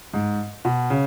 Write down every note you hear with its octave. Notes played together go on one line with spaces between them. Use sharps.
G#2
B2
C#3